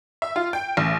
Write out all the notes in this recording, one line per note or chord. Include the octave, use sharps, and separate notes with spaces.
E5
F4
G5
A1